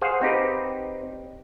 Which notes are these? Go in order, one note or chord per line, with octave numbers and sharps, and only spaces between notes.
G#4 C5 F5 F#5
C4 D#4 G4 B4